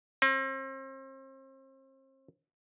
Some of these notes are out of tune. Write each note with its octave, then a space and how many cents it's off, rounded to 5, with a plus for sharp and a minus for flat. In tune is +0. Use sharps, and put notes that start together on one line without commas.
C4 +40